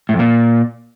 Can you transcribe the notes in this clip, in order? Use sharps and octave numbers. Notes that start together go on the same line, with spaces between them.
A2
F2
A#2